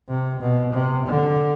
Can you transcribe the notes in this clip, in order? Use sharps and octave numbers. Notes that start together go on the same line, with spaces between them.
C3
B2
C3
D3